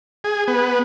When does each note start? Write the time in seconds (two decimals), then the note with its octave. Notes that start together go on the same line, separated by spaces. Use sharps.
0.24 G#4
0.48 B3